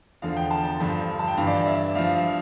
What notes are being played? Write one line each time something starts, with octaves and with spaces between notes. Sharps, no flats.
E2 D3 F3 F5
G5
A5
A5
G2 D3 F3
A5
G5
G2 E3 F5
D5
E5
G2 F3 F5